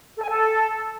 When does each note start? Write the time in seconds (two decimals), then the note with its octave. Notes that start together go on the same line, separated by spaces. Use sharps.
0.16 A4
0.23 G#5
0.29 A4